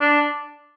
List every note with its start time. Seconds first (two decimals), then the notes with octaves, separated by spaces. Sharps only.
0.01 D4